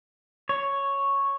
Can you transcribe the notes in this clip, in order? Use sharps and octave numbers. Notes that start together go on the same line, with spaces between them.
C#5